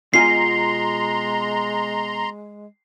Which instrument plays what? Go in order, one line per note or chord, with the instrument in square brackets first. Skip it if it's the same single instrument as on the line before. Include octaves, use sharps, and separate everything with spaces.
[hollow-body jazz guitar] B2 F4 G#5 [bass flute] G#3 [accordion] A#5 C6 [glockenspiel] C7